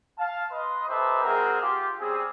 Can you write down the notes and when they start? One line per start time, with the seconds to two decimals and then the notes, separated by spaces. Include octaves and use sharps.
0.18 F5 A5
0.51 B4 D#5 C6
0.88 D#4 G4 A4 B4 C5 E5
1.24 G#3 C4 F#4 G#4 A#4
1.61 F4 G4
2.00 G3 C4 C#4 G#4